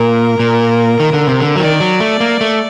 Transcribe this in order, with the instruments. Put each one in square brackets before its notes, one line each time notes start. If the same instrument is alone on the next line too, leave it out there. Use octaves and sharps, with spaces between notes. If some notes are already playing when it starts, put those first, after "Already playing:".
Already playing: [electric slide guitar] A#2 [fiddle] A#4
[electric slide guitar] A#2
D#3
D3
C3
D3
F#3
[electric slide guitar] D#3 [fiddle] D5
[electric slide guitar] F#3
A3
A#3
A3